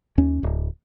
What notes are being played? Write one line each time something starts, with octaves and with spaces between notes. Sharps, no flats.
D#2 C#4
D1